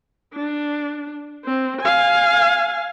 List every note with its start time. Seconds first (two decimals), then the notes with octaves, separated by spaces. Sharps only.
0.34 D4
1.45 C4
1.81 F5 G#5